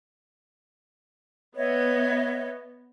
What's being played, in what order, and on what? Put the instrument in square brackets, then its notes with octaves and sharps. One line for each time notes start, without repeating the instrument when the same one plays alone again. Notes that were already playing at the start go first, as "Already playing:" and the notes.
[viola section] B3 [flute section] C#5 D#5 E5